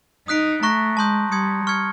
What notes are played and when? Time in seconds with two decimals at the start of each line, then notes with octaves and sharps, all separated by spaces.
0.27 D#4 D#6 F#6 B6 D7
0.63 A3 A#5 C#6 F#6 A#6
0.97 G#3 A5 C6 D#6 G6
1.32 G3 C6 D#6 G#6 C#7
1.67 C#6 F6 G#6 C#7